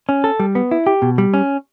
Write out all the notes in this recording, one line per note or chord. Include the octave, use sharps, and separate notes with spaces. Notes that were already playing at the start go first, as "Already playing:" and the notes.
C#4
A4
G3
B3
E4
G4
B2
G3
C#4